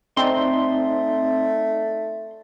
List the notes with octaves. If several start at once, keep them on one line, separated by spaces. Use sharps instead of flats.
A3 C4 D#4 D5 G#5 C6